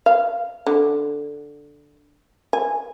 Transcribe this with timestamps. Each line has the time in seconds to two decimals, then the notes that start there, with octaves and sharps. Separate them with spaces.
0.06 F5
0.66 D3
2.53 G#5